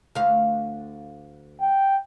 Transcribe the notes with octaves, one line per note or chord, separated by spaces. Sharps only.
D2 F5
G5